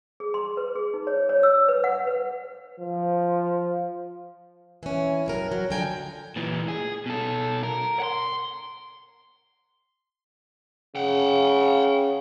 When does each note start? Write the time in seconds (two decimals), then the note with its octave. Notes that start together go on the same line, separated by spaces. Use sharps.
0.20 G#4
0.34 C6
0.57 B4
0.76 G#4
0.94 D#4
1.07 C#5
1.29 C#5
1.43 E6
1.68 B4
1.84 F#5
2.07 B4
2.80 F3
4.83 E3 C#4
5.26 F2 F#3 A#4
5.52 F#3
5.70 D3 F3 G5 G#5 A#5
6.36 A#2 E3
6.68 G#4
7.06 B2 A4
7.63 A#4
8.00 F#5 C6
10.96 C#3 F#5 G5